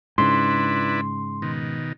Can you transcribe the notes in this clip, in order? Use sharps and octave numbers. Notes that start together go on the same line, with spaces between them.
G#2 C#3 D4 E4 B4 C6
B2 D#3